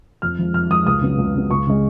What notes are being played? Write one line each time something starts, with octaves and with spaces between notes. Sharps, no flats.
F2 F6
F3 G#3
F2 F6
F3 G#3 D#6
C#2 D#6
C#3 F#3 B3
C#2
C#3 F#3 B3
C#2 C#6
C#3 G#3